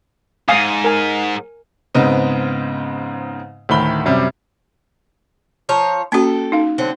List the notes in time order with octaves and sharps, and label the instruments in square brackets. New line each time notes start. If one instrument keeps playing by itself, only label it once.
[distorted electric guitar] E2 G#2 [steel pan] F5 G#5 D#6
[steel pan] A#4 G#5
[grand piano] G#2 C#3 B3 C4 D#4
D2 A2 D#3 B5 G7
F#2 C3 G3
[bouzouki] F3 C#5 A#5
[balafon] A#3 C#4 F#4 [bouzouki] A4 G5
[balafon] D#4 F5
[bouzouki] D3 F#3 C4